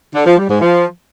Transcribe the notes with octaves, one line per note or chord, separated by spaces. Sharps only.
D3
F3
G3
G#2
F3